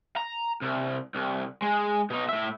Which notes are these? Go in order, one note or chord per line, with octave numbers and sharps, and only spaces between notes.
A#5
C2
C2
G#3
B2 D#4
A2 E5